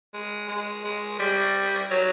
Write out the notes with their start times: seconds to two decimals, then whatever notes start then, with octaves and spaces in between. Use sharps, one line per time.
0.14 G#3
0.49 G#3
0.84 G#3
1.19 G3
1.91 F#3